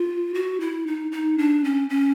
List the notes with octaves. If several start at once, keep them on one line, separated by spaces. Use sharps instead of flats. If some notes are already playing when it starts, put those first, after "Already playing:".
Already playing: F4
F#4
E4
D#4
D#4
D4
C#4
C#4